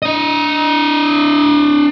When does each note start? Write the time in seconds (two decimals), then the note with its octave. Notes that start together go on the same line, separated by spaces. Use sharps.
0.02 D4 D#5